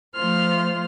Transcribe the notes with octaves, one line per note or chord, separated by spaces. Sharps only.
F3 A3 F4 C5 C6 F6